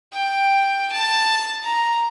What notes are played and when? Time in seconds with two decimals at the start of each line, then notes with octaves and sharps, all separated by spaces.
0.14 G5
0.92 A5
1.63 A#5